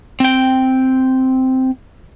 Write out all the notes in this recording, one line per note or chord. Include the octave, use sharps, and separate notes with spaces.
C4 G5